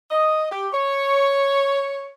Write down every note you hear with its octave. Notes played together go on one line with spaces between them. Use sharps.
D#5
G4
C#5